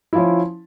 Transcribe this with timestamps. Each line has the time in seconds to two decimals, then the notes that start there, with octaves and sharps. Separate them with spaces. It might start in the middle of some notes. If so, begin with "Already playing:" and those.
0.13 E4
0.15 F3
0.18 C#4